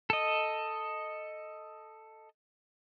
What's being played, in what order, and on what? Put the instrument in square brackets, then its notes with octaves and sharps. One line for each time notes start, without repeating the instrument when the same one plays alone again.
[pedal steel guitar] A4 D#5